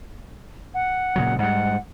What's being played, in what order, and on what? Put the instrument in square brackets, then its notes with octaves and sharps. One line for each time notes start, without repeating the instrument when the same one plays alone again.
[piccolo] F#5
[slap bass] A#2 C#3 F#3
[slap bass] G#2 G3 [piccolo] F#5